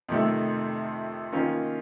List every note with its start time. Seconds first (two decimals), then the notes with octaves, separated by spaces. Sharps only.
0.09 F2 C3 D#3 A3
1.32 D#3 A#3 C#4 F4